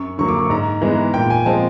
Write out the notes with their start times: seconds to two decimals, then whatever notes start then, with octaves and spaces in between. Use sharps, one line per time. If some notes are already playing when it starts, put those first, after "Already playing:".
Already playing: F#2 C#6
0.18 D3 F#3 A#3 C#6
0.29 D6
0.39 C#6
0.50 G#2 A#5
0.82 E3 G#3 B3 A#5
1.14 A#2 G5
1.30 G#5
1.46 F3 G#3 C4 A5